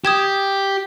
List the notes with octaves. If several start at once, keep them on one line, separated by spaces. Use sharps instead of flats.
G4 D#6 G#6 E7